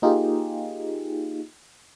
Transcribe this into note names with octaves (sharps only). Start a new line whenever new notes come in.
A#3 D#4 F4 G4 G#4